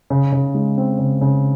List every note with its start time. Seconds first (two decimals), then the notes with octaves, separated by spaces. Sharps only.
0.10 C#3
0.32 C#3
0.55 G#3
0.77 C4
0.99 C#3
1.21 C#3